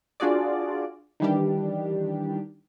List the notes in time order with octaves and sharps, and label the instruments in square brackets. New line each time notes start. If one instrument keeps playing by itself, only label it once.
[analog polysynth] D4 F4 F#4 G#4 D5
D#3 E3 G3 D4 G4